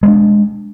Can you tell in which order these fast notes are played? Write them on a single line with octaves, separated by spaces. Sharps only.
G#3 A#3 D4